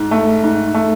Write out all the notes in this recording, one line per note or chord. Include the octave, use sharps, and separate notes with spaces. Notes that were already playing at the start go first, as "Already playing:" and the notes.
Already playing: G#2
A3
G#2
A3